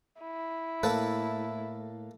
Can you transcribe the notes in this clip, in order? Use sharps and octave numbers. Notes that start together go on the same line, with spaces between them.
E4
A2 A#3 A4 B4